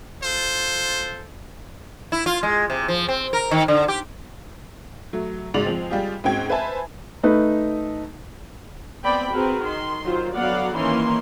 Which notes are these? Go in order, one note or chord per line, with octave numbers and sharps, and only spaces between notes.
F4 A4 C5
E4
F4
G#3
C3
F3
C4
A#4
D#3
D3
G4
F#3 A3
G#2 C#3 F#4 D5 F7 F#7
F3 G#3 C4
G3 G#3 F4 G4 G#4
G#2 C4 C#4 F#4 G5 G#6
B4 C5 E5 G#5 A5
A3 D#4 B4
B3 C4 D5 G5 B5
C4 F#4 G#4 A#4 B4
D#3 C6
D#3 F#3 F4 C5
D3 F#3 B3 D5 F5 F#5
D#3 E3 A#3 C#4 D#4 C6